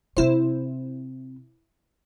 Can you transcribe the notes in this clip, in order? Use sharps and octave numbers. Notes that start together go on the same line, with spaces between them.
C3 C4 E4 C5